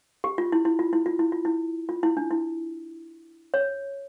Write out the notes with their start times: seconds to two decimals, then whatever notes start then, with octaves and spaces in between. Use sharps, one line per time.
0.24 G4
0.38 F4
0.52 E4
0.65 E4
0.79 F4
0.93 E4
1.06 F4
1.19 E4
1.32 F4
1.45 E4
1.89 F4
2.03 E4
2.17 D4
2.31 E4
3.54 C#5